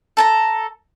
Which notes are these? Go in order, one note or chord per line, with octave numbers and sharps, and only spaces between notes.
A4 A5 A#5